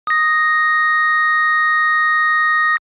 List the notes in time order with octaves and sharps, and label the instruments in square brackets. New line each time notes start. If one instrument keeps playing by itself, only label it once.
[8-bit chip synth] D#6 A#6